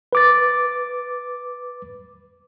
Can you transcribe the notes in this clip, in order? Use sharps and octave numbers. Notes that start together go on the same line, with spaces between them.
B4 D6 A6